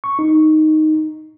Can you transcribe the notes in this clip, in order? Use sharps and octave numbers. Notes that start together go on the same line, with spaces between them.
C#6
D#4